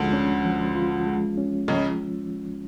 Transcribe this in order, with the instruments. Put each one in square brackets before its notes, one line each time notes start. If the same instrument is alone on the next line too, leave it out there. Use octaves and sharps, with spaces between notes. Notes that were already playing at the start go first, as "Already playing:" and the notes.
Already playing: [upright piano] D2 D3 [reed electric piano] F3 G#3 C#4 F4
[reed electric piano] C#4
F3
F4
G#3
C#4
[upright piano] C#2 C#3 [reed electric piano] F3